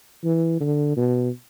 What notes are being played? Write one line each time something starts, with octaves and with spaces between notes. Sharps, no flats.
E3
D3
B2